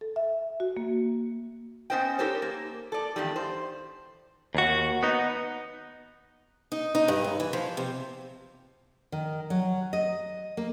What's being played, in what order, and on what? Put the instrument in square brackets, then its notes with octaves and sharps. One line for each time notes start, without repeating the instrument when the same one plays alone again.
[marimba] A4
E5
F#4
A#3
[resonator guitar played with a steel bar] B3 C#4 C5 D#5 G5
D#4 G4 A4 A#4 C5 C#5
A#3
A4 D5
E2 G2 D#3 G3
C5
[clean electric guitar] D#2 F#4
B3 D#4
[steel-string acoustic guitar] D#4
D#4
G2
F#2
E3
F3
C3
[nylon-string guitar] D#3
F#3
D#5
A#3